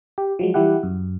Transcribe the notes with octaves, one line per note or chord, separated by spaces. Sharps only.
G4
F3 F#3 G#3
E3 G3 E4 G4 F#5
F#2